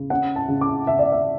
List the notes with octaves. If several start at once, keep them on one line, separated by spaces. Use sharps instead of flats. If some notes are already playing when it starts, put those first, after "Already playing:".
Already playing: C#3
C#4 F#5
A5
C#3
D6
C#3 E5
D5
E5